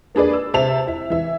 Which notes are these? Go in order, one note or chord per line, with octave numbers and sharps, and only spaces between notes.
A#3 D4 G#4 B4 D5
E6
C3 E5 A5 F7
E4 E5
E3 E5